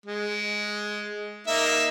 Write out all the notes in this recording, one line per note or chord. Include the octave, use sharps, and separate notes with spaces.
G#3
A#3 D#4 E5